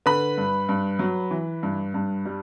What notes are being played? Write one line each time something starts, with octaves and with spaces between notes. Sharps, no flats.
D3 B4 B5
G2
G2
F#3
E3
G2
G2
G3